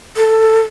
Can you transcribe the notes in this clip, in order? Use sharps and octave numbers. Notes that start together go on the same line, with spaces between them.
A4